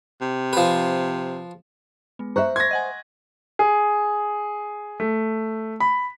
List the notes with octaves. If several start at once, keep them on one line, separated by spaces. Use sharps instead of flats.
C3
F3 B4
G#3 B3
C5 E5 A#5 C#6 F#6
C6 C#6 G#6 A#6
D#5 F#5 G#5
G#4
A3
B5